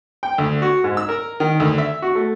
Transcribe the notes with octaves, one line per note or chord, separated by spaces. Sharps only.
G5
D2
F#4
G#2
E6
A#4
D#3
D2
E5
F#4
A3